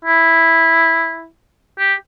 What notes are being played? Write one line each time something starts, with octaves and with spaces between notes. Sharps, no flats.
E4
G4